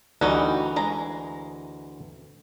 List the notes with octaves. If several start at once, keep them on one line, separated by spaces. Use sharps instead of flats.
D2 E3 G3 D#4 F#4 D#5
G#3 A#5